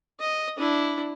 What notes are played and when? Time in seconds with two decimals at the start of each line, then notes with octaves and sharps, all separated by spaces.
0.20 D#5
0.58 D4 E4